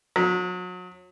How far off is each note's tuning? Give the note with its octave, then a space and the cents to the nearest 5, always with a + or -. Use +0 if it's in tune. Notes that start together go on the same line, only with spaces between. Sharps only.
F#3 -35